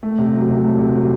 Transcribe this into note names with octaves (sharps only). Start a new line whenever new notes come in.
A3
C3
F#3
C3
A3
C3
F#3